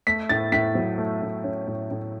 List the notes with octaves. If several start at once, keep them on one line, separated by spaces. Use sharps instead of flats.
A3 B6
A2 A6
A2 B6
F#3
A3
A2
C#4
A2
A2